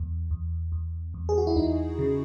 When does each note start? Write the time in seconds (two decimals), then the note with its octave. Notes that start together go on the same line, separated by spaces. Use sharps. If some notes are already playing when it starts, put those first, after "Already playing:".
Already playing: E2
0.31 E2
0.72 E2
1.14 E2
1.29 G#4
1.38 F#4
1.47 E4
1.56 E2 D#4
1.99 C#3